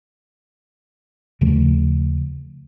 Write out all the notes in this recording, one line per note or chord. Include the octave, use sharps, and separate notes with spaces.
D#2 C#3 F3 A3